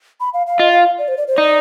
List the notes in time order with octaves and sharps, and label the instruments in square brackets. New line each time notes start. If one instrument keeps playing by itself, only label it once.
[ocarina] B5
F5
F5
[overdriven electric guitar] F4 [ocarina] D#5
[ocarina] F5
D5
C5
D5
C5
[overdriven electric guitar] D#4 [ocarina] D5